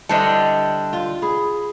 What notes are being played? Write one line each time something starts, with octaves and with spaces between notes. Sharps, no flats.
D3 G3 E4 C5 D#5 A5 E7
F4
G#4 B5